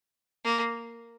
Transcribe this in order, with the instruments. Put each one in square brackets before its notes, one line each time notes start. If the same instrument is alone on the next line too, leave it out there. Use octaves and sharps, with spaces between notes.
[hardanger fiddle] A#3